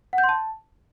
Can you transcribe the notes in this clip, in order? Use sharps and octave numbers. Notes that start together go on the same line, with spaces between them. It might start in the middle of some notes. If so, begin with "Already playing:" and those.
F#5
G6
C6
A5